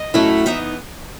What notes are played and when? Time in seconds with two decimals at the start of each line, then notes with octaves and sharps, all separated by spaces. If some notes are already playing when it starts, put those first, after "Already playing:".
Already playing: D#5
0.14 A2 F#3 A3 C#4 E4
0.46 E3 B3 D#4 E5